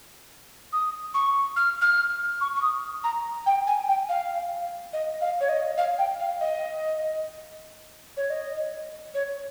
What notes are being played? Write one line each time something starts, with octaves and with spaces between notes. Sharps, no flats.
D#6
C#6
F6
F6
C#6
C#6
D#6
A#5
G5
G#5
G5
F5
D#5
F5
C#5
D#5
F5
G5
F5
D#5
C#5
D#5
C#5